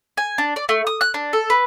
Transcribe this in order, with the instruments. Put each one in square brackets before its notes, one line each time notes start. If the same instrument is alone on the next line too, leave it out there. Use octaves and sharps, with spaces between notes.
[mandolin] G#5
D4
D5
A3
D#6
F#6
D4
A4
B4